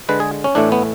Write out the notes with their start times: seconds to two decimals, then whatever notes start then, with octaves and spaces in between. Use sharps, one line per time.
0.09 D3 G#3 B4
0.20 G#4
0.44 C#4
0.55 A2 E3 A3 D4
0.72 B3